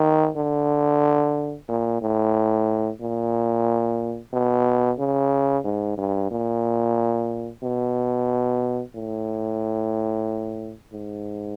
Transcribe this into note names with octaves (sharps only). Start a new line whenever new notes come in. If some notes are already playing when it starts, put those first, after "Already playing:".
Already playing: D#3
D3
A#2
A2
A#2
B2
C#3
G#2
G2
A#2
B2
A2
G#2